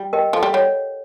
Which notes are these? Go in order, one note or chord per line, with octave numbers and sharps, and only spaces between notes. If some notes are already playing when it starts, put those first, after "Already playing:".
Already playing: G3
G4 A#4 D#5 G5
F3 A4
G3
G3 C#5 F#5